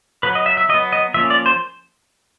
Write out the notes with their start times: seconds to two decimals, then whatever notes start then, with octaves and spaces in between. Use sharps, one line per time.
0.23 F#3 B3 B4
0.35 D#5
0.46 E5
0.57 E5
0.69 F#3 D#5
0.74 B3
0.92 D#5
1.14 F3 A#3 C#4 E5
1.30 D5
1.46 C5